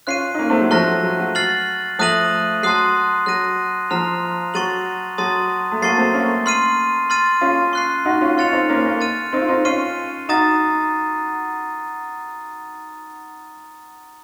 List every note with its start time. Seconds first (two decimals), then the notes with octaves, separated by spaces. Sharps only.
0.07 C#4 F4 F#6 C7 D#7
0.34 D#4
0.39 A#3 C#4
0.50 A3 C4
0.61 F#3
0.71 F3 A3 C#6 F#6 A#6
0.87 F#3
1.03 F#3
1.19 F#3
1.35 F6 A6 C7 F#7
1.99 F3 A3 D#6 F#6 A#6 D#7 F#7
2.63 F#3 A5 C6 D#6 F#6 C7
3.26 F#3 F#6 A#6 D#7
3.90 F3 A#5 F6 C7 F7
4.54 F#3 C#6 A6 D#7 F#7
5.18 F#3 A5 C6 D#6 A6
5.72 A3
5.82 F#3 A#3 A5 C#6 A6 C7
5.98 A3 C4
6.14 A#3 C#4
6.46 C6 F6 C7 D#7
7.10 C6 F6 A6 D#7
7.41 C#4 F4
7.73 C#6 F#6 C7
8.05 D#4 F#4
8.21 C#4 F4
8.37 C#4 F4 C#6 F6 A6 C#7 F7
8.53 C4 D#4
8.69 A#3 C#4
8.85 A#3 C#4
9.01 F6 A6 D#7
9.33 C4 D#4
9.41 F4
9.49 C4 D#4
9.65 C#4 F4 C#6 F6 C7 D#7
10.29 D#4 F#4 A#5 D#6 A6